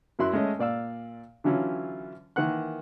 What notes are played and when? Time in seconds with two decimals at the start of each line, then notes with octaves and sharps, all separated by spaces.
0.19 F#2 F#3 E4 C6 F#6
0.33 G#3 A3 C#4 D#5
0.59 A#2 D5 F5 E6
1.44 D3 E3 F#3 C#4 E4 F4
2.36 D#3 E3 A#3 F#5 F#6